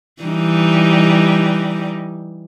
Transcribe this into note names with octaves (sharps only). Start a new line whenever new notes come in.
E3 G3 D#4